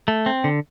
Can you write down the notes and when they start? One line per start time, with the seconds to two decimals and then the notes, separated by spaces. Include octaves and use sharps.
0.08 A3
0.26 C4
0.44 D3